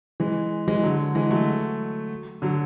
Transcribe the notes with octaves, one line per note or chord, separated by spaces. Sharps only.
E3 G#3
E3 G#3
D3 F#3
E3 G#3
F#3 A3
D3 F#3